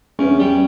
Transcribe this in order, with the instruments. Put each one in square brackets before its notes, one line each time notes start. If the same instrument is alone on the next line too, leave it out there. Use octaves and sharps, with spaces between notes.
[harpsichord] E2 [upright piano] C#4
[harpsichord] G3